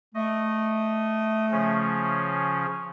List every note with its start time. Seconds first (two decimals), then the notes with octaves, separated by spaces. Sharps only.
0.15 A3 D#5
1.51 C#3 F3 C#4